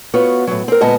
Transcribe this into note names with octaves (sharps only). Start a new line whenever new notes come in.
B3 F4 F#4 C#5
A2 F#3
C4 A#4
D2 A#2 G#3 B3 D#5 A5